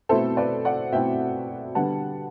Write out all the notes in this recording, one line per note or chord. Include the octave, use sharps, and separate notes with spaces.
B2 A3 C4 E4 A4 C5
B4 D5
D5 F#5
B2 A3 C4 E4 E5 G5
D3 G3 B3 D4 F#5 A5